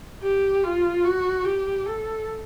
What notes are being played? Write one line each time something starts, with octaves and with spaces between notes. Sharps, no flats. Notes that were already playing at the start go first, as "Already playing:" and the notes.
G4
F4
F#4
G4
A4